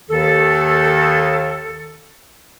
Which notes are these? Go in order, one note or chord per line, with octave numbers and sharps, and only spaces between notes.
D#2 D#3 A4